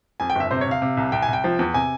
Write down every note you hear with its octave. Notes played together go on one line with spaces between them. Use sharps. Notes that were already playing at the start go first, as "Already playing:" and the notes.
F2 G#5
G5
G1 E5
C3 C5
C#5
C3
F5
C3
C2
C2 G5
G#5
C2 G5
F3
E2
C3 G#5